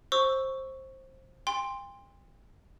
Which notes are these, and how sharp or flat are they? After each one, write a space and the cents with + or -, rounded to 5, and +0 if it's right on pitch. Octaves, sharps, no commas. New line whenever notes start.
C5 +20 C#6 +5 E6 +0
G5 +40 C6 +0